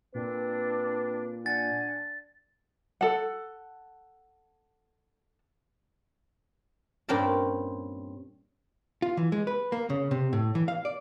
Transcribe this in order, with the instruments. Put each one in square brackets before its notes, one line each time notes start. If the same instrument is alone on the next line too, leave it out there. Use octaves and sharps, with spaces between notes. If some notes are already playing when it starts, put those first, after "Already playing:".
[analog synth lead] A#2 [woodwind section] C4 D4 [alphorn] B4
[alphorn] D4 [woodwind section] F#5 G#5 [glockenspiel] A6
[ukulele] A4 F#5
[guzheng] G2 A#2 C4 C#4 A#4 A5
[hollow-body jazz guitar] F4
E3
G#3
B4
A#3
C#3
C3
A2
E3
F5
D5